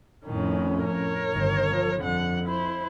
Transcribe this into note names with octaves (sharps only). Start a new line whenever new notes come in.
F2 A2 D#3 C#4
A#4 C#5
G1 D#3
F3
F2 D3 F#5
E4 C5